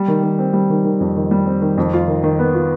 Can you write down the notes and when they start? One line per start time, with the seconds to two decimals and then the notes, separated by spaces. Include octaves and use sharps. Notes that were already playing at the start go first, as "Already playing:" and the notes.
Already playing: G3
0.08 D#3
0.23 D#3
0.39 C4
0.53 G3
0.70 D#3
0.84 D#3
1.00 F2
1.16 D#3
1.31 G3
1.46 C4
1.61 D#3
1.77 F2
1.93 F4
2.08 D#3
2.23 D#3
2.39 B3
2.55 F4